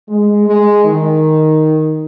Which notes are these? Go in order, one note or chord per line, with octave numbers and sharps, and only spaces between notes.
G#3
G#3
D#3